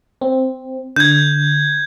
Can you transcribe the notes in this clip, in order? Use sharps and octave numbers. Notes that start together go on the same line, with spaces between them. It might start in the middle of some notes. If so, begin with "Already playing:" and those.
C4
D3 G6 G#6